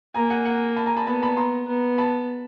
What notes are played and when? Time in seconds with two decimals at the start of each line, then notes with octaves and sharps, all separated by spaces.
0.14 A#3 G#5 A#5
0.30 F#5 G#5
0.45 F#5 G#5
0.76 A5 B5
0.86 G#5 A#5
0.96 A5 B5
1.06 B3 A5 B5
1.22 A5 B5
1.37 A#5 C6
1.68 B3
1.98 A5 B5